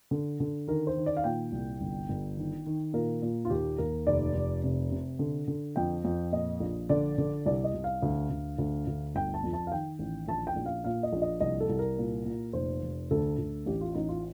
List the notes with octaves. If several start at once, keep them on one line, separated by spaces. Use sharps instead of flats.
D3
D3
D#3 A#4
C5
D#3
D5
F5
A#2 G5
C2
G1
G1
D#3
D#3
A#2 A#4
A#2
F4
D#2 G4
D#2 A#4
F1 D5
F1
C3
C3
D3
D3
F2 G5
F2
A#2 D#5
A#1
D3 D5
D3
C2 D5
D#5
C2
F5
D2
D2
D2
D2
G1 G5
A5
F2
A5
F5
D#3 G5
A1
A#1 A5
G5
A#1
F5
A#2 F5
D#5
A#1
D#5
C2 D#5
A4
C2
A#4
A#2
A#2
F1 C5
F1
D2 A4
D2
A1 G4
F4
A1 D#4
F4